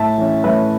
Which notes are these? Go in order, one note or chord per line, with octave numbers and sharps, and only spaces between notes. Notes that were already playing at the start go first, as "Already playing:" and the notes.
Already playing: A2 E5 A5
E3 C#4
A2 B4 E5